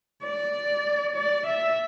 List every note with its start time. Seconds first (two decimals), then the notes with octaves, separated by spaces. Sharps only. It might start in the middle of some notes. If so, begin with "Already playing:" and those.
0.23 D5
1.15 D5
1.46 E5